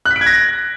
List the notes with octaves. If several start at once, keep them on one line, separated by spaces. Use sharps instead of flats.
F#6
B6
D7
G#6
A#6